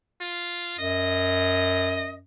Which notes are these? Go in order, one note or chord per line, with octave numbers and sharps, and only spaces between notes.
F4
F#2 D#5